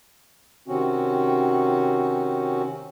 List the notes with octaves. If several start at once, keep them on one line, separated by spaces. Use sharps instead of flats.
C3 D#3 C4 C#4 F#4